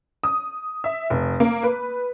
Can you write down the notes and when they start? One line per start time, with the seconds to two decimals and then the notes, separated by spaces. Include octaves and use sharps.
0.24 D#6
0.84 E5
1.10 F1
1.40 A#3
1.63 B4